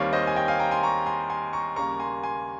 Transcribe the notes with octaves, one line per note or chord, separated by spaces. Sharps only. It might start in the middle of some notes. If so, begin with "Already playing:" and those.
Already playing: D#2 D#3 G3 C4 C#5 F5
C5 D#5
G#5
D#5 G5
F5 G#5
G5 A#5
G#5 C6
A#5 C#6
G#5 C6
G#5 C6
A#5 C#6
D#2 C#3 G3 A#3 A#5 C#6
G#5 C6
G#5 C6